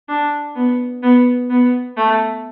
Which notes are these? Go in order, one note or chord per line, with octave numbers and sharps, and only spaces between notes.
D4
B3
B3
B3
A3